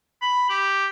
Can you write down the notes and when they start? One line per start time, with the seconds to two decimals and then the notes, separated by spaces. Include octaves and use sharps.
0.21 B5
0.49 G4